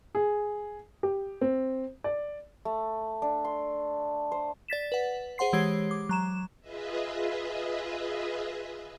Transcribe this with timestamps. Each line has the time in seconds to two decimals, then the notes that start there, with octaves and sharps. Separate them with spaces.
0.15 G#4
1.03 G4
1.41 C4
2.04 D5
2.65 A3
3.22 D4
3.45 C6
4.32 C5
4.68 D5 A6 B6 E7
4.92 B4 F#5
5.38 G#4 C5 F#5 C6 C7
5.53 E3 G#3 G4 C#5 G#6 C7
5.91 D6
6.09 F#3 A#5 E7
6.61 F4 G#4 B4 D#5 E5